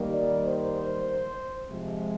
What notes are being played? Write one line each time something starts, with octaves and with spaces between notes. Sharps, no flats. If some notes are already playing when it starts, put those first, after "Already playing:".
Already playing: D#3 G3 A#3
D5
C5
C3 F3 G#3